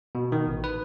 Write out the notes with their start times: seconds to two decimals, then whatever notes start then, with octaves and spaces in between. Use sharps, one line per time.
0.15 B2
0.32 D#3
0.47 A1
0.64 B4